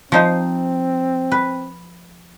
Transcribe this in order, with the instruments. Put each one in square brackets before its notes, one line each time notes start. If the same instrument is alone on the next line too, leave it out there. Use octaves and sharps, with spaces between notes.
[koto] F3 D#4 C5 [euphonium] C4
[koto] B4